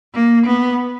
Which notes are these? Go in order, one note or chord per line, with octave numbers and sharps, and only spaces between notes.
A#3
B3